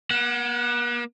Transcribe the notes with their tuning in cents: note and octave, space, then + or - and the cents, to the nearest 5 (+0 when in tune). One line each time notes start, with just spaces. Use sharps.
A#3 +45 F#5 +0